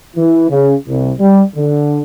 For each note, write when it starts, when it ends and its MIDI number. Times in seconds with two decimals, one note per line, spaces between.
0.16 0.48 52
0.50 0.75 49
0.89 1.14 36
1.20 1.42 55
1.56 2.02 50